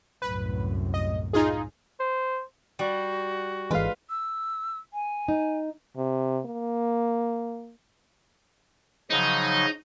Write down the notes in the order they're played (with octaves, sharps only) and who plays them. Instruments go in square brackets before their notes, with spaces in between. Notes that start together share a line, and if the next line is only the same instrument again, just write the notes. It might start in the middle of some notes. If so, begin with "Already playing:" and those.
[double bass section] C2 F#2 A2 [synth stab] B4
[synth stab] D#5
D#4 F4 G#4
[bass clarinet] C5
[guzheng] G3 [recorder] F#4
[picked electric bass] G#1 E3 [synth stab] G#3 A3 F5 [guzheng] F4 B4
[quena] E6
G#5
[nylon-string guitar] D#4
[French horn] C3
A#3
[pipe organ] C#3 F3 F#3 [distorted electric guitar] D#4